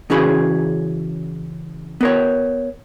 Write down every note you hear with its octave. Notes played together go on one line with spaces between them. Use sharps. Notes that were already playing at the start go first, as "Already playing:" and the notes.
C#3 E3 C#4 F#4 G#4 B5
B3 A#4 C#5